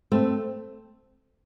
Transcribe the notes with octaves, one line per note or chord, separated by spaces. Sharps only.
A3 C4